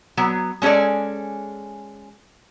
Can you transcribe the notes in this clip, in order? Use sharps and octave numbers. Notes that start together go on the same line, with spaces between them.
F#3 B3
G#3 C#4 G#4 A4 D5